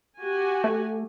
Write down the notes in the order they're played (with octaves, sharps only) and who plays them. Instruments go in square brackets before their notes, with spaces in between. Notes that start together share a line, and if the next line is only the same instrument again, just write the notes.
[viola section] F#4 G4 G#5
[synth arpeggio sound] A3